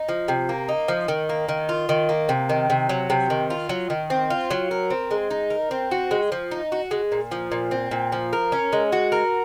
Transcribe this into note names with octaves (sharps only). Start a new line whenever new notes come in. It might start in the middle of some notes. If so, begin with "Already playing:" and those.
Already playing: D#4
F3
C3
A#3
D#4
F3
D#3
A#3
D#3
F4
D#3
A#3
C3
D#3
C3
F#3
C3
D#3
F4
F#3
D#3
C4
F4
F#3
A#4
C4
G#3
D#4
A#4
C4
F#4
G#3
F3
D#4
F#4
G#3
A#2
F3
A#2
C4
A#2
F3
A#4
C#4
G#3
F#4
A#4